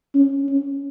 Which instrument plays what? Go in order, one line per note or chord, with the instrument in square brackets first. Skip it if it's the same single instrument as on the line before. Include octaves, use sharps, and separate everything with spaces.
[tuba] C#4
C#4